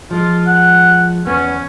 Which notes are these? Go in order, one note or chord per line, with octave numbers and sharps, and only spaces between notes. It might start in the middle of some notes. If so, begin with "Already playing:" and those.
F3 G#3 F4
F#5
E2 B3 C#4